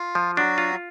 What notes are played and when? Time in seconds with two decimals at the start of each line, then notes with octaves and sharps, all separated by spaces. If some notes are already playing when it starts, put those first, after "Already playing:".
Already playing: F4
0.15 F3
0.36 F#3 D4 F#4
0.58 F4